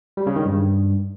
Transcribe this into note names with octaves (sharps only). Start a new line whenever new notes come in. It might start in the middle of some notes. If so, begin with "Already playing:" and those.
G3
C#3
D#3
G2